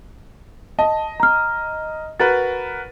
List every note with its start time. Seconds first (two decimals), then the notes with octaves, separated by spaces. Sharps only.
0.79 D#5 A5
1.20 A#5 F6
2.20 F#4 A#4 B4 A6